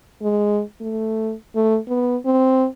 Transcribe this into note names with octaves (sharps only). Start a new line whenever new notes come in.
G#3
A3
A3
B3
C4